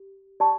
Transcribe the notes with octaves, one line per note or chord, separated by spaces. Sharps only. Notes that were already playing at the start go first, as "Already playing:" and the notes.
Already playing: G4
G4 D5 A5 C#6